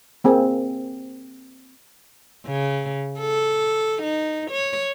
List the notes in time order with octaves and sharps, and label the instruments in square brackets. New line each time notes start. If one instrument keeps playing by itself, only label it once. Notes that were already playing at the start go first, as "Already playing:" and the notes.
[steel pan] A#3 C4 G#4
[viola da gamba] C#3
A4
D#4
C#5